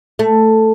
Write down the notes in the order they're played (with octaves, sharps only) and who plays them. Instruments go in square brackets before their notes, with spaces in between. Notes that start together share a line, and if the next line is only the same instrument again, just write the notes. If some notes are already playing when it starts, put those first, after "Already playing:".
[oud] A3